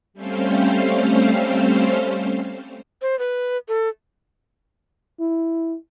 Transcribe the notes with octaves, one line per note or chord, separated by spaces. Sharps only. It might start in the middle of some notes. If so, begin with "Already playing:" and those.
G3 A3 C4 C#4 C5 F5
C5
B4
A4
E4